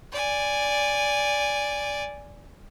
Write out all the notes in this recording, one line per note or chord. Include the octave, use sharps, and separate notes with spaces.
D5 G#5